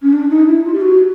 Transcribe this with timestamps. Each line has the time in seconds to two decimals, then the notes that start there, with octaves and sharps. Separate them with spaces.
0.02 C#4
0.13 D4
0.30 D#4
0.47 E4
0.64 F4
0.73 G4
0.81 F#4